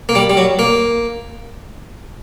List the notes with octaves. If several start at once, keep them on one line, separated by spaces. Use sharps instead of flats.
A#3
G3
G3
F#3
A#3